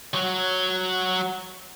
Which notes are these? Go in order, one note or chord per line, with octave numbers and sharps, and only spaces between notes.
F#3 F#4